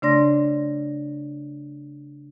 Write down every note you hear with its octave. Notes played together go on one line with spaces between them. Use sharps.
C#3 A3 D4 D5 C6 A#6